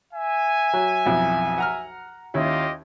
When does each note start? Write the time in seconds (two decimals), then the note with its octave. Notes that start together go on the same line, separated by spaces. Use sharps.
0.13 E5 G#5
0.73 F#3
1.06 B1 F2 E4
1.58 F#5 A#5 F6
2.34 D#2 C#4 E4 F4 G4 D#5